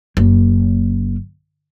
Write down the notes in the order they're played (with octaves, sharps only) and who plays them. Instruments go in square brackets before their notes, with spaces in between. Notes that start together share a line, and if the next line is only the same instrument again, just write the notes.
[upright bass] F#1 A#3